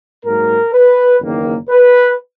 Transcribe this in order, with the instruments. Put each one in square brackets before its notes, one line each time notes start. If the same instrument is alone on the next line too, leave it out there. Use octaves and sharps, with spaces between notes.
[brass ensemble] G#2 F#3 A#3 A#4
B4
F#1 E2 D#3 A#3
B4